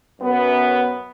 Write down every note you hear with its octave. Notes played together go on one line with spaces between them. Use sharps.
F#2 B3